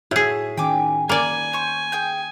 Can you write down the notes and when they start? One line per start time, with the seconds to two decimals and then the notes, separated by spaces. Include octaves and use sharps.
0.11 A2 F#4 G#4 E5
0.57 D#3 C#4 G5 G#5 D6
1.09 A#3 D5 G#5 B5
1.53 C5 C#6
1.92 G#4 G5 G6